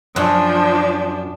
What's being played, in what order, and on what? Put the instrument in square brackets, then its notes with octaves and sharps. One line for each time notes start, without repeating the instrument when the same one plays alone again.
[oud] F#2 [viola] F3 [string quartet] D4